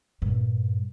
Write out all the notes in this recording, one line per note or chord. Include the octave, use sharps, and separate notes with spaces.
G2 A#2